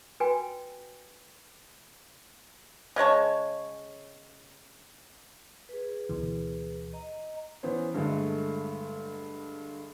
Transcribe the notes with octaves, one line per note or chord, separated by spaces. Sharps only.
F4 F#4 B4 G5 G#5
C#3 G#3 C#5 A5
G#4 B4
D2 B2 E3
D#5 A#5
E3 B3 C#4 C5
G2 D3 G#3 A3